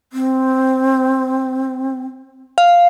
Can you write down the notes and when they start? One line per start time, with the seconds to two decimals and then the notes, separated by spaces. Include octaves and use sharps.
0.13 C4
2.58 F5